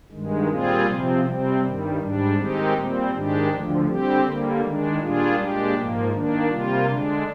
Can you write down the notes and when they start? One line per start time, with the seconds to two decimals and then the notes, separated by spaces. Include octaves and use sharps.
0.12 G2 D#3 G#3
0.49 A#2 G3 C4 F4 G#4
0.86 C3 F3 C4
1.24 C3 G3 C4
1.61 G2 D#3 G3
1.99 G#2 G3 D4
2.36 D#3 G#3 C4 D#4 G4
2.74 A#2 G3 C4
3.11 G#2 D#3 G#3 D4 G4
3.49 D2 D3 F3
3.86 D3 G3 C4 G4
4.24 D3 G3 A#3
4.61 D#3 G#3 D4
4.99 A#2 G3 D4 F4 G#4
5.36 A#2 G#3 D4 G4
5.74 G#2 F3 A#3
6.11 D#3 A#3 D4
6.49 C3 G3 A#3 F4
6.86 D3 G#3 D4